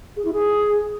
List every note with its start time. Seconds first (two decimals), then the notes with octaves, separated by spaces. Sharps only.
0.17 G#4
0.25 E4
0.33 G#4